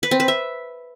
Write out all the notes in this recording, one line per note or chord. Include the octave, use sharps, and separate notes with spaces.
B4
C4
B4
E5